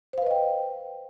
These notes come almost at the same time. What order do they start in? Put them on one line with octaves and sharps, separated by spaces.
C5 F5 B4 D#5 G5